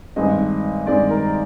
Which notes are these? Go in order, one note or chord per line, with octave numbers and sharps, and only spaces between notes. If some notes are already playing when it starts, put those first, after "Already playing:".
G2 D#3 G#3 C4 D#5
G2 D#3 G#3 C4 D5
A#4